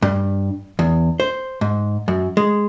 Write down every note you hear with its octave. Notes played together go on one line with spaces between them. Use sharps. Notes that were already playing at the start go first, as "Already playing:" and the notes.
G2
E2
C5
G#2
F#2
G#3